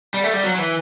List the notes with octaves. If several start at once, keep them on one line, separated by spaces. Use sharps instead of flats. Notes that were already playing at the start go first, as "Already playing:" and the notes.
G3
A3
G3
F#3
F#3
E3